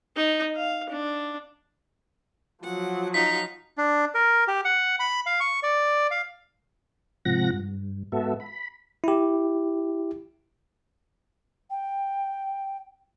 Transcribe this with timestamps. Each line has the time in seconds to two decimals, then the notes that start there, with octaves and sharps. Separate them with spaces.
0.16 D#4
0.56 F5
0.90 D4
2.63 F3 F#3 F#5
3.14 D#4 F5 B6
3.78 D4
4.15 A#4
4.48 G4
4.65 F#5
5.00 B5
5.26 F5
5.40 C#6
5.63 D5
6.11 F5
7.25 G#2 C3 F3 F#5 A#6
7.53 G2
8.12 G#2 B3 F#4 A4 E5
8.40 B5
9.04 E4 G4
11.71 G5